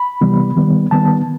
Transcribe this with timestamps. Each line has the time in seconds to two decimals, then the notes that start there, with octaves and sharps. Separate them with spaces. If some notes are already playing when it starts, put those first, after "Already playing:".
Already playing: B5
0.21 C3 E3 G3 B3
0.57 D#3 G3 B3
0.91 D#3 G3 B3 A5